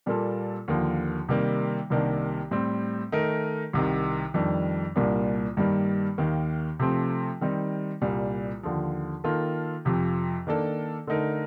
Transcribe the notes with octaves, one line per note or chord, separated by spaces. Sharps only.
A#2 G3 A#3 F4 A4
D#2 D3 F3 A#3
C3 D#3 G3 A#3
C2 C3 D#3 A#3 D4
A2 G3 C4
D#3 A3 D#4 A#4
C2 C3 D#3
F2 D#3 G3 D4
C2 A#2 G3 A#3 D4
G2 D#3 G3 A#3
D#2 D#3 A#3
C3 F3 A3 C4
D#3 G3 C4 D#4
C2 A#2 G3
D#2 D3 F3
D#3 A#3 F4 A4
F2 C3 F3
D#3 A#3 D4 A4
D3 A3 D#4 A#4